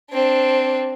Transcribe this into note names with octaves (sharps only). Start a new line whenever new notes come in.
C4 D4